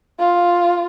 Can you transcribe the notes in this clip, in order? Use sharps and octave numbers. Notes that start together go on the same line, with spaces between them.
F4